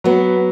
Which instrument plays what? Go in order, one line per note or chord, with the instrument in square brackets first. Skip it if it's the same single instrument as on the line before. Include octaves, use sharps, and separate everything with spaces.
[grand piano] F#3 [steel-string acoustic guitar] B3